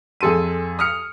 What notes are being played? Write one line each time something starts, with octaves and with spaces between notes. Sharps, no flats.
F2 G#4 A4 C6 D#7
D#6 F6 C#7